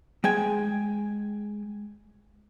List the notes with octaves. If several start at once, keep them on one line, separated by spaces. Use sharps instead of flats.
G#3 G5 G#5